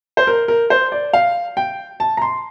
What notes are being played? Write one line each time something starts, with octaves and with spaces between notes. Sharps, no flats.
C5
A#4
A#4
C5
D5
F5
G5
A5
A#5
C6